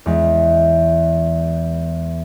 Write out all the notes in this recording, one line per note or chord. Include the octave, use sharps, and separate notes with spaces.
E2 G#3